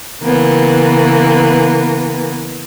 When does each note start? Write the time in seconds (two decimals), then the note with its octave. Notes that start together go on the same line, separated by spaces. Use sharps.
0.22 C#3 E3 A#3 B3